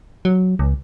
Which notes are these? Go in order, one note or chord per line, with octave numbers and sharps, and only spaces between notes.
F#3
C#2